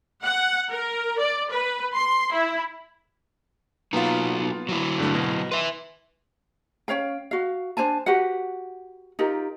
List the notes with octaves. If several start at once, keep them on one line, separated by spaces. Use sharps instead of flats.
F#5
A#4
D5
B4
C6
E4
F#3 A#3 B3 D#4 F4
F#3 E4
G2 D3 A3
B2
B4 E5 C6
C#4 C#5 F5 G5
F#4 F5
D4 C5 G#5 A5
F#4 G4 B4 F#5
D#4 F4 G4 A#4